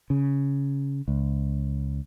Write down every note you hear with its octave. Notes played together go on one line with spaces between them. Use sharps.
C#3
C#2